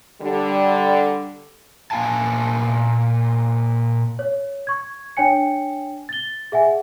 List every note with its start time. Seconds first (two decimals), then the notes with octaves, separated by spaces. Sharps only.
0.22 D3 G3
1.91 A#2 A#3 G#4 F5 G#5 A5
4.19 C#5
4.67 C#6 G#6
5.17 D4 C#5 G5 G#5 C#7
6.09 A6 G7
6.52 G#4 E5 F#5 G#5